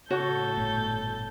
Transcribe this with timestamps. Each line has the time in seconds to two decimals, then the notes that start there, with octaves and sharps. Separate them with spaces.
0.11 A2 C#3 F#4 A4 C#5 C#6 G6
0.57 G1 A#2 A3